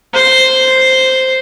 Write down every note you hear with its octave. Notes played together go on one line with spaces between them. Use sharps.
C5